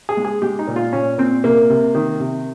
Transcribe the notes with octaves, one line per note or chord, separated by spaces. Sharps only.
G#4
G#3
G#4
G#3 G4
D#4
A#2
F4
A#2 C#4
A#2 C4
C3 A#3
C3
D#3
C3